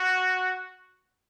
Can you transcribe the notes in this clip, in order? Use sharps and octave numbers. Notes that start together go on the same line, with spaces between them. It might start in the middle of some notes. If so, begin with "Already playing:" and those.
Already playing: F#4